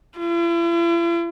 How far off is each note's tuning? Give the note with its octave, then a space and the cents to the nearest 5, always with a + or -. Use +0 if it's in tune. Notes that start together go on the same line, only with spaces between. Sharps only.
E4 +45